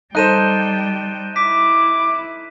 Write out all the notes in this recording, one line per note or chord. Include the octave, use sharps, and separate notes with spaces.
G3 D#4 A4 C5 G5 F#6 D#7 E7
E4 D6 B6